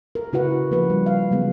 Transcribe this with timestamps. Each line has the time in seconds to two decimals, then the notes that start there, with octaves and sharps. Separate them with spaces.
0.15 A#4
0.33 C#3 E4 F#4 A#4 B4 F#5
0.71 F3 A#3 C#4 B4
0.90 G3
1.06 F5
1.31 C#3 F#3 G#3 B3